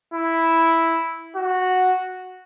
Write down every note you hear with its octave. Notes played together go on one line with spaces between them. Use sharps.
E4
F#4